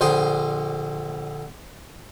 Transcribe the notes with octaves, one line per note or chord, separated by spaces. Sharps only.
A#1 D3 C5 G5 D#6